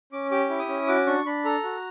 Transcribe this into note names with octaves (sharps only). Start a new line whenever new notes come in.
C#4 D6
G4 D6
E4
D#6
C#4
F#4 D6
D4 C#6
D4 B5
A4 A#5
F#4